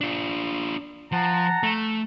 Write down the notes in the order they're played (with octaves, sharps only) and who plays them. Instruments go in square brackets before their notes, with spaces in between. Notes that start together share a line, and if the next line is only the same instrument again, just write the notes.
[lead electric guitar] D4 F4
[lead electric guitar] F3 [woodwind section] F#5 A5 A#5
[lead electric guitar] A3